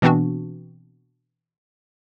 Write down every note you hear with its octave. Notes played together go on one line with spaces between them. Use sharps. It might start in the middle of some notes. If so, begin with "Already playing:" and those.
B2 E3 B3 C4 D4 F#4